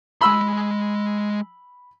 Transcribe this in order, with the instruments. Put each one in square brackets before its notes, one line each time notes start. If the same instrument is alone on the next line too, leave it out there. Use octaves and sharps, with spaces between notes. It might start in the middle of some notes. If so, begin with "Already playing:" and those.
[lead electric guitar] G#3 C6 [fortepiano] B5 E6